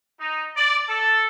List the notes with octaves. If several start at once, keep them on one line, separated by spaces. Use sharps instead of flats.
D#4
D5
A4